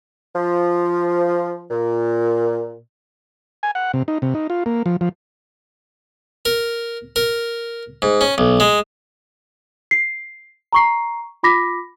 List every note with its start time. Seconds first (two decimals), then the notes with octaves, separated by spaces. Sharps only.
0.35 F3
1.71 A#2
3.63 G#5
3.75 F#5
3.94 C3
4.08 D#4
4.22 C3
4.35 D#4
4.50 F4
4.66 A#3
4.86 F3
5.01 F3
6.45 A#4
7.16 A#4
8.02 G#2
8.21 C#4
8.38 B1
8.60 G#3
9.91 C7
10.73 A#5 C#6 C7
11.43 F4 B5 D6 A#6 B6